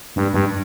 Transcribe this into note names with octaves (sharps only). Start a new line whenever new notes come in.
G2
G2